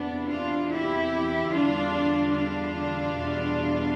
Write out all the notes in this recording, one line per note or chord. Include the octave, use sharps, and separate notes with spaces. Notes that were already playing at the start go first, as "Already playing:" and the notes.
Already playing: E2 C3 E3 B3 D4
D4 F4
E4 G4
E2 D3 G3 D4 F4
D4 F4
E2 B2 G3